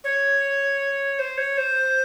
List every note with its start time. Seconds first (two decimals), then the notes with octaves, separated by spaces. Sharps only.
0.04 C#5
1.19 C5
1.38 C#5
1.57 C5